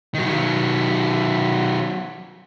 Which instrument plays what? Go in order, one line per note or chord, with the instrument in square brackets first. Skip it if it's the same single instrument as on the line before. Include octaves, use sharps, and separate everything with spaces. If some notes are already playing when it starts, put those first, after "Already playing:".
[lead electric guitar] D#3 F#3